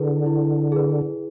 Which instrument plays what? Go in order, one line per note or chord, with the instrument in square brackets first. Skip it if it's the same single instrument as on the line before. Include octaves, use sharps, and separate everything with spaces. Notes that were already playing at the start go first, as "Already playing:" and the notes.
Already playing: [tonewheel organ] D3 [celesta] E4 G#4 B4
[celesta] E4
G#4 B4